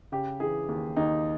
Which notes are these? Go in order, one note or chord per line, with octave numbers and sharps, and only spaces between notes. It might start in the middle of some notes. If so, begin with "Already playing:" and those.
C#3 G4
E3 G#4
D#2
D#2 D#4